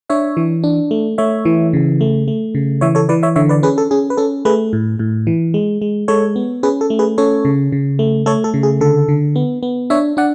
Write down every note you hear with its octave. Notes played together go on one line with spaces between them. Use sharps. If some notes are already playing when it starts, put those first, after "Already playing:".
D4 C#5 E5
E3
D4
A3
A3 C#5 E5
E3
C#3
A3
A3
C#3
E3 C#5 E5
A4 C#5
E3 B4 D5
C#5 E5
D3 C#5 E5
B4 D5
C#4 G#4 B4
A4
C#4 G#4
B4
C#4 A4
A3 G#4 B4
A2
A2
E3
G#3
G#3
G#3 A4 C#5
B3
C#4 G#4 B4
A4
A3
G#4 B4
C#4 A4 C#5
C#3
C#3
A3
A3 A4 C#5
A4
C#3
G#4
D3 A4
D3
B3
B3
D4 C#5 E5
D4 D5 F#5